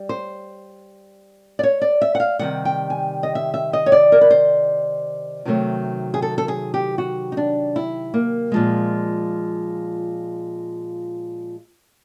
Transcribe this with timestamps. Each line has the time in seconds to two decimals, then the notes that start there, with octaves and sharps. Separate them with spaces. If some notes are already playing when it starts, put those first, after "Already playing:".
Already playing: G3
0.09 C5
1.59 D5
1.63 C#5
1.81 D5
2.01 E5
2.15 F#5
2.20 F5
2.39 C3 D#3 G3 F#5
2.65 G5
2.90 G#5
3.23 D#5
3.35 E5
3.54 E5
3.73 D#5
3.86 C#5
3.92 D5
4.12 A#4
4.21 B4
4.31 C5
5.45 C3 D#3 F#3 A3
6.14 G#4
6.22 A4
6.38 A4
6.48 G#4
6.74 G4
6.98 F#4
7.32 D#4
7.37 D4
7.76 E4
8.14 A#3
8.52 A#2 F3 G#3